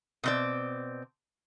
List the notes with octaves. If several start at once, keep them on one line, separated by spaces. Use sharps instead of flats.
B2 C4 D5